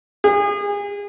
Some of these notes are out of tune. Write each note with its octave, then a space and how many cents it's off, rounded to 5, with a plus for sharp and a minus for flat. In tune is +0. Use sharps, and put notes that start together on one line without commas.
G#4 -35